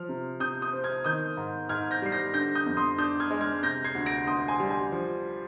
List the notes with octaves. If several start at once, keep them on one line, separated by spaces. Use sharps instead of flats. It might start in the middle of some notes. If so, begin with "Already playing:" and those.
Already playing: F3 F6
C3
C3 D#6 G6
D#6 G6
C4
F6 G#6
D#3 D#6 G6
G#2
G#2 F6 G#6
G6 A#6
G3 C7
G6 A#6
D3 G6 A#6
D#6 G6
F2
C6 D#6
D4 D#6 G6
F6 G#6
G#3
F6 G#6
C3 G6 A#6
G#6 C7
D2
A#6 D7
D2 C6 D#6
G#5 C6
G3
G#5 C6
F3